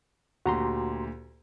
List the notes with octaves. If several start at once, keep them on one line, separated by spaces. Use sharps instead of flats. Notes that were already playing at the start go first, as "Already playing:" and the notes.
D2 A#2 F#4 G4 A#5 C6